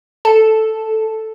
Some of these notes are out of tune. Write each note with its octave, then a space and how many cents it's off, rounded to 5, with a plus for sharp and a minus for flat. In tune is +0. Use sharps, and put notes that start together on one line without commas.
A4 +0